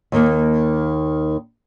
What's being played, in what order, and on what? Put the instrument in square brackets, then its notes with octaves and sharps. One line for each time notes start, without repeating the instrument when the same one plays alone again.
[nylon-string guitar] D#2 D#3 A#3